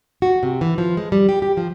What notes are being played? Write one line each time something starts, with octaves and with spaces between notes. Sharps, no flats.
F#4
C3
E3
F3
G#3
G3
G4
G4
F3